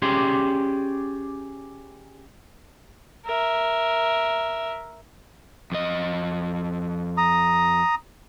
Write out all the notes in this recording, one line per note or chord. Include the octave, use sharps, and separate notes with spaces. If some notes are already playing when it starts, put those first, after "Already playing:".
C#4 G4 G#4 D5 C6
A#4 E5
F2 D#5
A#5 D#6